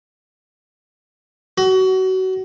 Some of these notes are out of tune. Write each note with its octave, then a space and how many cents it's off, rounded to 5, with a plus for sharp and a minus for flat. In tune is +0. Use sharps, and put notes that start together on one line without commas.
F#4 +25